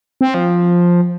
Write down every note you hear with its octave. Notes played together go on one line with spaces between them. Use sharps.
C4
F3